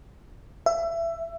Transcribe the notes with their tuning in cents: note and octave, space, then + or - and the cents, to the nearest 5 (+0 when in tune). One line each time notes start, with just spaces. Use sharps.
E5 +20